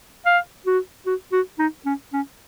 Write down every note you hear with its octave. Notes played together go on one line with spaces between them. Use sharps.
F5
F#4
F#4
F#4
D#4
C#4
C#4